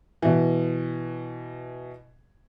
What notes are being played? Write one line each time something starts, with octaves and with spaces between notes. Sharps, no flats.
B2 E3